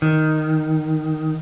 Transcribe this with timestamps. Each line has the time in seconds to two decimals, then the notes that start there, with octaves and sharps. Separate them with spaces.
0.02 D#3